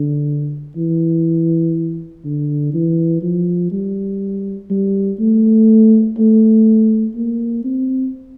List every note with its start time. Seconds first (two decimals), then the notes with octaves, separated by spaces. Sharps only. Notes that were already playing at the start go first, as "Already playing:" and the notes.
Already playing: D3
0.76 E3
2.25 D3
2.74 E3
3.23 F3
3.72 G3
4.70 G3
5.20 A3
6.18 A3
7.16 A#3
7.65 C4